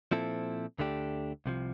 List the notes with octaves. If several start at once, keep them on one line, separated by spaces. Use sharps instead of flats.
A#2 F3 C4 E4 A4
D2 D3 A3 D4 G4
C2 C3 F3